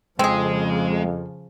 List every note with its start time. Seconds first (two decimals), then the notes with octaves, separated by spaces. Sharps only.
0.19 F2 C#3 F3 G#3 C4 G#4